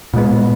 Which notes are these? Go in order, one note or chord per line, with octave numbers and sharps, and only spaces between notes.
A#2 G#3 B3